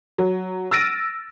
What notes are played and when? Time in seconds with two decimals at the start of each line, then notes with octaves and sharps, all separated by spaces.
0.18 F#3
0.71 E6 F6 A6 A#6 D7 D#7